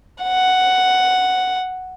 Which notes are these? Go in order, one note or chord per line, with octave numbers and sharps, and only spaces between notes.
F#5